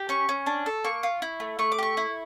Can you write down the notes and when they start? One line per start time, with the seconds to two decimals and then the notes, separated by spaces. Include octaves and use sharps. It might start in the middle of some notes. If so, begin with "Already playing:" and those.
Already playing: G4
0.09 C#4 C#6
0.29 C#4
0.46 D4
0.66 A4
0.85 A#3 C#6
1.03 F4
1.22 E4
1.40 A3
1.59 A3 C#6
1.72 D6
1.79 G4 C#6
1.97 E4